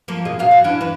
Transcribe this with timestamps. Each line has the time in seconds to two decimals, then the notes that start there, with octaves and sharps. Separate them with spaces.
0.08 F3 A#3
0.25 B2 G#4 D#5
0.39 A#2 F#3 F5
0.51 F#4
0.64 E3 C#4 D4
0.81 E2 B4